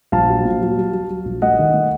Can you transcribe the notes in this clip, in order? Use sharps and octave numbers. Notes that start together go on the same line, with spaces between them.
A#1 F5 A5
F#3
A#2
F#3
F#3
F#3
F#3
A#1
A3 D#5 F#5
D#3
A3